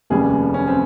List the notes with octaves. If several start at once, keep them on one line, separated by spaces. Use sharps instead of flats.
F1 D#2 C#3 G3 G#4
C#4
C4